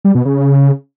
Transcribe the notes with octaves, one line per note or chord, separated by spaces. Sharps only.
G3
B2
C#3